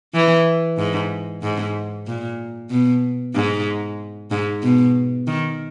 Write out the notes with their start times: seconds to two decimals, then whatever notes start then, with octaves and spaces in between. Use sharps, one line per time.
0.14 E3
0.78 G#2
1.43 G#2
2.07 A#2
2.71 B2
3.35 G#2
4.31 G#2
4.63 B2
5.27 D#3